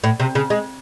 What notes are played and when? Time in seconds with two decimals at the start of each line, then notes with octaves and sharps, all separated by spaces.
0.04 A2
0.20 C3
0.35 C#3
0.50 G#3